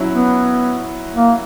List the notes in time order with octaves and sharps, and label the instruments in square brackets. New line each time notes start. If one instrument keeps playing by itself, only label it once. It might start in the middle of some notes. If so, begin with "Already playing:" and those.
Already playing: [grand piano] F#3 C#4 E4
[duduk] B3
A#3